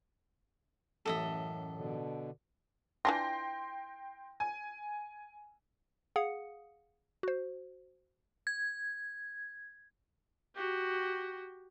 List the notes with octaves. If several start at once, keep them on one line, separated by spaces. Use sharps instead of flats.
A1 F#2 A4 D#5 E5
B2 D3
E3 D4 F4 G5 C6 A#6
G#5
G#4 F5 F#5 D#6 C#7
F#4 C5
G#6
F#4 G4